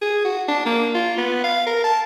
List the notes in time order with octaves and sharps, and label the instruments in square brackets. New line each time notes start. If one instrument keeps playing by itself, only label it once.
[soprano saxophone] G#4
F#4
D4
A#3
F4
B3
F5
A#4
A5